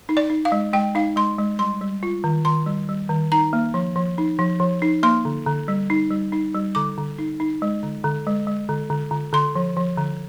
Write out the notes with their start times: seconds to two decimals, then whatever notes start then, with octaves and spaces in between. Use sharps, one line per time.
0.09 D#4
0.17 D5
0.30 D#4
0.45 F5
0.52 G#3
0.73 G#3 G5
0.95 D#4 F5
1.16 G#3 C6
1.39 G#3
1.59 G3 C6
1.81 G3
2.03 F4
2.24 D#3
2.45 D#3 C6
2.66 G3
2.89 G3
3.10 D#3
3.32 D#4 A#5
3.53 A#3
3.74 F3
3.96 F3
4.18 D#4
4.39 F3
4.60 F3
4.82 D#4
5.03 A#3 C6
5.25 D3
5.46 D3
5.68 G3
5.90 D#4
6.11 G3
6.32 D#4
6.55 G3
6.75 D3 D6
6.98 D3
7.18 D#4
7.40 D#4
7.62 G#3
7.83 D3
8.04 D3
8.27 G#3
8.47 G#3
8.69 D3
8.90 D3
9.11 D3
9.33 D3 C6
9.56 F3
9.76 F3
9.98 D3